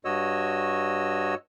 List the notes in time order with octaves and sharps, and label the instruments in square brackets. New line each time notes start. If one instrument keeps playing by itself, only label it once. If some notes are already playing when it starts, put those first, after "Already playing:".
[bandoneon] G2 F#4 C#5 D#5 E6